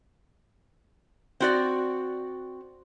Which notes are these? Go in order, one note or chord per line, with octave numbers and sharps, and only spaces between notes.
C4 F#4 D5